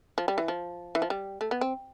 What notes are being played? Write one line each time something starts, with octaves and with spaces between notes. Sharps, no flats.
F3
G3
E3
F3
E3
F3
G3
A3
B3
C4